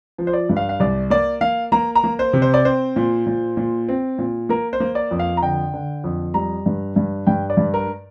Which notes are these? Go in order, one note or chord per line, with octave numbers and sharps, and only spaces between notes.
F3
C5
D5
G2
F5
F5
C2 D5
A#3 D5
A#3 F5
A#3 A#5
A#5
A#3
C5
C3
C5
D5
C4 C5
A#2
A#2
A#2
C4
A#2
A#3 A#4
C5
A#3
D5
F2
F5
A#5
D3 G5
D3
F2
G3 A#5
G2
G2
G2 G5
D5
G2
A#4